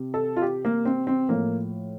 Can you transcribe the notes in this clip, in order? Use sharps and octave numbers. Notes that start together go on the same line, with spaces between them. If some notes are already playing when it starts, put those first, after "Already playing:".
Already playing: C3
A4
F4
G4
A#3
C4
C4
A2 F3 A#3